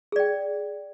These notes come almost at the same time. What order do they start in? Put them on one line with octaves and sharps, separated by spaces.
G#4 D5 G5